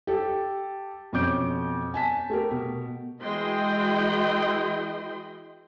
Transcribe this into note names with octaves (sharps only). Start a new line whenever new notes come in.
G4 A4
F2 B2 C#4 D6 G6 D7
G#5 A5 B6
A3 G4 A#4
B2
E3 G#3 F#4 D#5 G5 C6